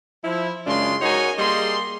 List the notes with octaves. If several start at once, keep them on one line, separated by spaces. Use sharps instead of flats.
F3 E4
F#2 C#3 G#3 D4 F4 C6
D#4 F#4 A#4 C#5 D#5 G#5
G3 A#3 G#4 D#5 C6